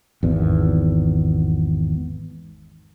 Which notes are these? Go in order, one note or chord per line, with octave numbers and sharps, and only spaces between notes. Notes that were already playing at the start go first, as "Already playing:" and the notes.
G#1 E2